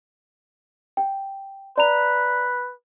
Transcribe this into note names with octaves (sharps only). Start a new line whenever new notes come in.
G5
B4 D5 A#5 F7